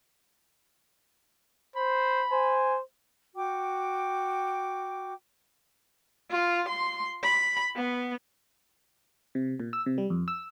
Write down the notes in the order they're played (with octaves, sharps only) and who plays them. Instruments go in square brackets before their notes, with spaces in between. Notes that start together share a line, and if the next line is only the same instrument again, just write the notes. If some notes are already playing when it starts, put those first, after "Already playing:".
[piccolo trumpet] C5 [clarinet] B5
[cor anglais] C5 [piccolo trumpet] G#5
[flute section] F#4 G5 D6
[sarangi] F4
C6
B5
B3
[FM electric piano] C3
A#2
E6
C3
G3
F2
E6